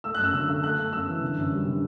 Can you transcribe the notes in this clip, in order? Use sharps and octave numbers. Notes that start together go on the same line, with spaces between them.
A3 E6
F#6
F#2 E6
D3 E6
A3
A3 F#6
A3
F#2 E6
E3
D3
F#2
G3
D3